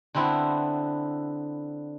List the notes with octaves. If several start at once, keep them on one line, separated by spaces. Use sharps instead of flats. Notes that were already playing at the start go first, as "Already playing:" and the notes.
D3 B3 C4 E4